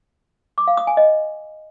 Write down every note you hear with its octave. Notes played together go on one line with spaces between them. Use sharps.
D6
F5
D#6
G#5
D#5